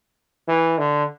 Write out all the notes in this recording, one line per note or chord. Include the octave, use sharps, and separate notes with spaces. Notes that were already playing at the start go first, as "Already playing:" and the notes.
E3
D3